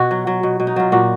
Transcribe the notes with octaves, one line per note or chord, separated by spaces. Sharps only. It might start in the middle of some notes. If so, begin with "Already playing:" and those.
Already playing: B2 F#4
F#3
F#3
B2
B2
D#4
F#3 F4
A#2 F#4